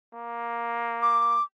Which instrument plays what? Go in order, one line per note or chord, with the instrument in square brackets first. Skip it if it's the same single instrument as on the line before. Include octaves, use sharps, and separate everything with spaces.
[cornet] A#3
[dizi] D6